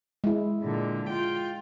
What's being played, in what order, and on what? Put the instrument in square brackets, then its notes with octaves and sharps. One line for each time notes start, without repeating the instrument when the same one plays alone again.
[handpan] G#3 E4
[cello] A#2 D3
F4 G5